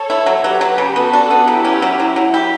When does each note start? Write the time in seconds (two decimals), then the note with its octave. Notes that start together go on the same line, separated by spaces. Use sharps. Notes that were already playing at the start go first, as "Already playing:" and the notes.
Already playing: A4 C#5
0.10 E4
0.26 F#3
0.44 F#3 G4 B4
0.61 F#3
0.78 C#3
0.96 B3 F#4 A4
1.13 D4
1.31 B3
1.47 F#3 E4 G4
1.65 C#4
1.82 F#3
1.99 F#3 E4
2.16 F#3
2.34 G4